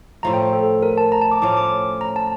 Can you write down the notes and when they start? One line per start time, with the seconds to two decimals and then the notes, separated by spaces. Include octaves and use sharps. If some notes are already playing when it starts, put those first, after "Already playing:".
0.23 A2 F3 A3 A#5
0.33 G5
0.53 A4
0.83 A#4
0.98 A5
1.12 A#5
1.22 A5
1.31 D6
1.42 A2 F3 C#4 D6
1.57 D6
2.01 A#5
2.16 A5